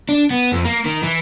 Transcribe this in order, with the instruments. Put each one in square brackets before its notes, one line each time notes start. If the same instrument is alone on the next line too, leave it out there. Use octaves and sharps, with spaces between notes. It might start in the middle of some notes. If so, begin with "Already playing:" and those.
[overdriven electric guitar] D4
B3
F2
A#3
D#3
E3